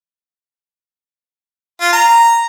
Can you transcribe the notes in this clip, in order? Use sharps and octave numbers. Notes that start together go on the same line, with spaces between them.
F4
A#5